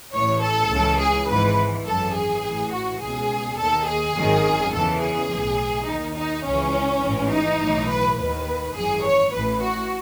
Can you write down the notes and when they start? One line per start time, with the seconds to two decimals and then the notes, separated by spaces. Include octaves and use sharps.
0.13 A1 A2 E3 C#5
0.42 A4
0.70 C#2 C#3 E3
1.00 G#4
1.28 G#1 G#2 E3 B4
1.85 G#1 F#2 E3 A4
2.14 G#4
2.43 A1 A2 E3
2.72 F#4
3.01 C#2 B2 G#4
3.58 D#2 D#3 A4
3.87 G#4
4.15 G#1 F#2 D#3
4.73 E2 C#3 E3 A4
5.02 G#4
5.30 B1 A2 E3
5.88 D#2 D#3 D#4
6.17 D#4
6.46 C#2 C#3 E3 C#4
7.03 A1 G#2 E3
7.32 D#4
7.61 B1 A2 E3
7.90 B4
8.18 D#2 D#3 B4
8.75 G#1 F#2 E3 G#4
9.05 C#5
9.33 A1 A2 E3 B4
9.62 F#4